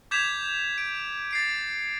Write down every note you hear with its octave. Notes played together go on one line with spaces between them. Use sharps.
D6 G6 G#6 B6 E7 F7
D7
A6 C7 D7